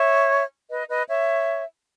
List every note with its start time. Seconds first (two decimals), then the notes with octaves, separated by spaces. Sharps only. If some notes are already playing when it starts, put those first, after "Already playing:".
Already playing: C#5 E5
0.70 B4 D#5
0.89 B4 D#5
1.09 C#5 E5